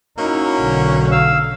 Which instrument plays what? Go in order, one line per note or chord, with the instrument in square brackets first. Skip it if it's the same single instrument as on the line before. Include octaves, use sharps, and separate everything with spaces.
[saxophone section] A#3 C#4 F#4 [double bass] D#4 E4
[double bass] B1 D3
[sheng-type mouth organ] F5 E6